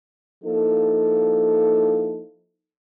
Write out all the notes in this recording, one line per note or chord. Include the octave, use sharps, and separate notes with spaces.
F3 A#3 D#4 E4 A4